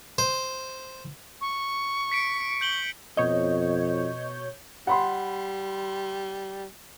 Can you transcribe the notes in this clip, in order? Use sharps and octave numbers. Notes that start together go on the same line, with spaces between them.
C5
C#6
B6 C#7 D7
G6 F#7 G7
F2 B2 C#5 D#5 G6
G3 F#5 B5 C6